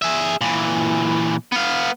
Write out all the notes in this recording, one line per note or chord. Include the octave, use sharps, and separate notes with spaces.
G#4 E5
A#2 E3
B3 F5